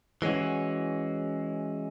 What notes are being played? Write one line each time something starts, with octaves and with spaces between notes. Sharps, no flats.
E3 G#3 C#4 F#4